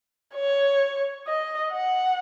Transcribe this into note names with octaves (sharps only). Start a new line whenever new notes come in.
C#5
D#5
F#5